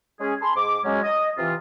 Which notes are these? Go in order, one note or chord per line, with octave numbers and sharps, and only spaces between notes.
G#3 C#4 G#4
G#5 A5 B5 C6
G#2 D6
F#3 G#3 C#4
D#5
C3 E3 F4